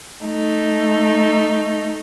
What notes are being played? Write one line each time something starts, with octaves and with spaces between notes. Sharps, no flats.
A3 D#4